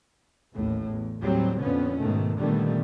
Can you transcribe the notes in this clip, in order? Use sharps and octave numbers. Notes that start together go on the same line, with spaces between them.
A1 D#2 A2
E2
D#2 A2 F#3 G3 C4
F2 A#2 D3 B3 C#4
G#2 B2 D#3 A3
A#2 D3 D#3 G3 A3 B3